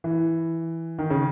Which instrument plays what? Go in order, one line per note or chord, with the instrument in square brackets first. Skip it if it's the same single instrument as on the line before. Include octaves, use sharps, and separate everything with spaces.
[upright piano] E3
D#3
C#3